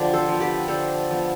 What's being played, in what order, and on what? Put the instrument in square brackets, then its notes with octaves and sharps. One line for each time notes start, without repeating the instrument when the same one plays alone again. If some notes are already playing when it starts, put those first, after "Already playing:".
Already playing: [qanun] D3 F3 G4
A4 C5
F3 B3
G4 B4
D3 A4 C5
F3 B3